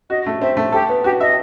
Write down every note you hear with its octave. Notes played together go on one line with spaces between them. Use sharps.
F#4 D#5
A3
C4 E5
A3
G4 A4
B3
F#4 G4
D#5 E5